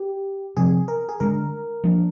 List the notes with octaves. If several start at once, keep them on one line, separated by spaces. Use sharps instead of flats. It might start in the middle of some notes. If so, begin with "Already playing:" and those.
Already playing: G4
C3 F3 C4 G#4
A#4
G#4
D3 G#3 D4 A#4
F3 A#3 D4